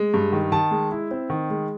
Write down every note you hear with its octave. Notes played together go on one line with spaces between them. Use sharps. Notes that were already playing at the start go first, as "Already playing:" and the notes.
Already playing: G#3
G2
D#3
D#3 A5
G#3
E4
C4
D#3
G#3